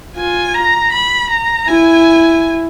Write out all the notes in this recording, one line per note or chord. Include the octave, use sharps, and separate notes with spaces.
F4 G#5
A#5
B5
A#5
E4 G#5